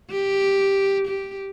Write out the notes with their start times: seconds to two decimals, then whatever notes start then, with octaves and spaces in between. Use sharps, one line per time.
0.10 G4
1.07 G4